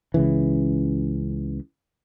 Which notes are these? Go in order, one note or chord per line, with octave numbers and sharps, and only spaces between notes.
C#2 C#3 E3